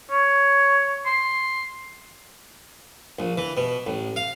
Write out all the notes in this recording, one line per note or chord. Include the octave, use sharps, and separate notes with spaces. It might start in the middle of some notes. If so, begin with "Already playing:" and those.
C#5
C6
A#1
E3
B2
A1
F5